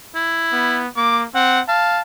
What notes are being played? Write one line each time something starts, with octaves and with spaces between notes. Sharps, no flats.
E4
B3
A#3 D6
C4 F#5
F5 A5